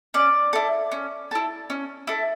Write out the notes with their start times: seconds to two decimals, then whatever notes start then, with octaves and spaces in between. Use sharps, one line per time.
0.14 C#4 D5
0.53 E4 A4
0.92 C#4
1.31 E4 A4
1.70 C#4
2.07 E4 A4